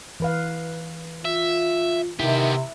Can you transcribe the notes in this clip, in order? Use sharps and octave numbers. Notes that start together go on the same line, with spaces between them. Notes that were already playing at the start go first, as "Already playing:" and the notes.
E3 B4 F5
F4 E5
C3 D#3 B3 E4 G4